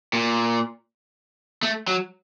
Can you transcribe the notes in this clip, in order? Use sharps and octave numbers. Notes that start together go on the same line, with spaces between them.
A#2
A3
F#3